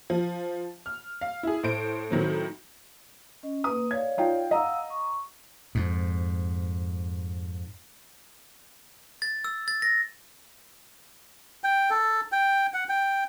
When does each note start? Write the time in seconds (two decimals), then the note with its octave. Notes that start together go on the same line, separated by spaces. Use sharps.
0.10 F3
0.86 F6
1.21 F5
1.43 E4 G#4
1.63 A2 C5 D7
2.10 A2 D#3 F#3 C4
3.43 C#4 D#5
3.64 A#3 B4 D#6
3.91 C#5 D5 F5 G#6
4.18 D#4 F4 G5
4.51 D#5 F5 F#5 A#5 E6
4.90 C#6
5.75 F2 G#2
9.22 A6
9.45 E6
9.68 A6
9.82 A#6
11.64 G5
11.90 A4
12.32 G5
12.74 F#5
12.89 G5